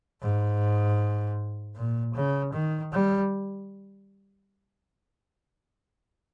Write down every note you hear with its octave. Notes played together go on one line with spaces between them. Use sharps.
G#2
A#2
C#3
D#3
G3